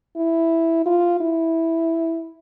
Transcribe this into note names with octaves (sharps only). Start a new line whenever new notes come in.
E4
F4
E4